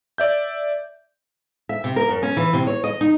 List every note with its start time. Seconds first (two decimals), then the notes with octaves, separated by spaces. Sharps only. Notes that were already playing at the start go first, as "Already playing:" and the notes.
0.18 D5 E5 G6
1.69 E5
1.84 C3
1.96 A#4
2.09 F#2
2.23 C#4
2.37 E3
2.53 C3
2.67 C#5
2.84 D#5
3.01 D#4